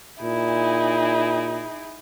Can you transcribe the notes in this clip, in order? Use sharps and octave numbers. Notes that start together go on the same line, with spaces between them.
A#2 D#4 E4 G#4